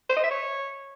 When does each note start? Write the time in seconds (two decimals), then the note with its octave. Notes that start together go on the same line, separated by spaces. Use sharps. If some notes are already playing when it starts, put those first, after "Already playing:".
0.10 C5
0.17 D#5
0.24 E5
0.31 C#5